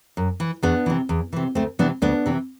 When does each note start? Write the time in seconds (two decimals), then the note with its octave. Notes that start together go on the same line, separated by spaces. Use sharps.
0.17 F#2
0.40 E3
0.62 E2 B3 D4
0.86 C3 E3
1.09 E2
1.33 C3 E3
1.55 D2 A3 C4
1.79 C3 E3 B3 D4
2.02 D2 B3 D4
2.26 C3 E3